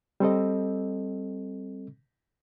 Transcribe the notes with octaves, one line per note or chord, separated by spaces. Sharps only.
G3 C4 A4 D#5